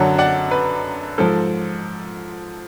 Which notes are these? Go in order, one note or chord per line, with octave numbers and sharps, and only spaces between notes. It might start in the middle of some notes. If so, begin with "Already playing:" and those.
Already playing: F#2 D3 F#3 F#5 A5
D5 F#5
B4
G#2 F3 A4